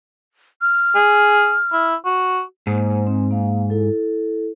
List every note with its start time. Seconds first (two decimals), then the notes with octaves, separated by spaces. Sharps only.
0.61 F6
0.95 G#4
1.73 E4
2.06 F#4
2.67 G#2 A#3 C5
3.07 C4
3.31 A#3 F5
3.70 E4 A4